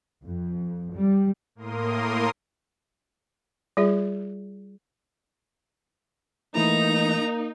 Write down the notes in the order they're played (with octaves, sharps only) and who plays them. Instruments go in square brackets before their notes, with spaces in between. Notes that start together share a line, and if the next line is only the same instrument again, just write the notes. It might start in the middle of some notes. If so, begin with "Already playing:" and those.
[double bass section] F2
G3
[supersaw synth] A2 A#3 A#4 C6 D#6
[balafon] G3 F4 G#4 E5
[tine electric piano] E3 A3 E4 [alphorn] A#3 [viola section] D#4 [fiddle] A#5